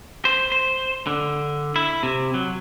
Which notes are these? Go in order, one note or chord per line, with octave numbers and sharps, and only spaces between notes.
C5
C5
D3
E4
C3
F#3